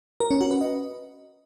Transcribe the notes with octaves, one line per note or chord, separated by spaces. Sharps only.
A#4
C#4
F#4
B4
D#5